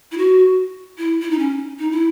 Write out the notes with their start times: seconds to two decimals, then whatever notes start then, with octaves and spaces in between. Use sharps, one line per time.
0.12 E4
0.18 F#4
0.98 E4
1.22 E4
1.30 D#4
1.39 C#4
1.79 D#4
1.91 E4